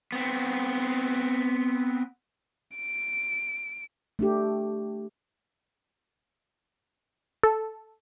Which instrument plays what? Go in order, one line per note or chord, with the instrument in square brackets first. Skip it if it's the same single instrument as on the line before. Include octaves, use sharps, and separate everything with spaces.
[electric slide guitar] B3 C4
[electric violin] D7
[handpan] A3 D4 G4
[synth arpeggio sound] A4